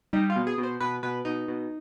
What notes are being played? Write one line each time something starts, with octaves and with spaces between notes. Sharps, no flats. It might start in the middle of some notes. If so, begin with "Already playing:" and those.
G3 D#4
F4
B2
G#4
B2
C5
B2 B4
B2 B4
B2 D#4
B2